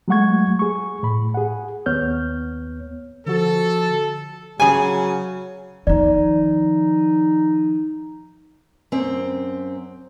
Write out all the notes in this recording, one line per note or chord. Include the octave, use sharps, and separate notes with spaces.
F#3 G#3 A3 F#5 C#6 G#6
G#4 C#6
A2 B5
G#4 F#5
D#2 B3 C#5 F6 G6
D3 F3 F#4 A4
C#3 F#3 G#4 G#5
D#3 F3 D#4 D5
F#2 C4